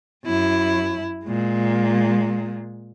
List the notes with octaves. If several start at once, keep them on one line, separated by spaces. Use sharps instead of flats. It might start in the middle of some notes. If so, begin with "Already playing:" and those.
F#2 E4
A#2 G#3